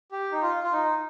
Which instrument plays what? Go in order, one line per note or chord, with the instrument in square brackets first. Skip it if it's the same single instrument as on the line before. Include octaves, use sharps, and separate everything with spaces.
[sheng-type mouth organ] G4
D#4
F4
F4
D#4